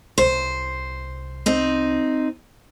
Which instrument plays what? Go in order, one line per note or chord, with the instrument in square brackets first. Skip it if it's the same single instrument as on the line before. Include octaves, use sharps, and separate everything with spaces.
[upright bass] C2 C3 [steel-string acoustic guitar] C5
[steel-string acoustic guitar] C4 D#4